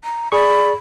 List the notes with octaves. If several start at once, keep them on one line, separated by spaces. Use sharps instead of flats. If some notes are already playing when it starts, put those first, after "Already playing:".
A#5
G#4 D5 B5 C#6